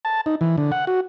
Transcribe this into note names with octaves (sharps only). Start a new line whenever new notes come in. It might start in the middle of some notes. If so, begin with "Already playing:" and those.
A5
D#4
E3
D3
F#5
F#4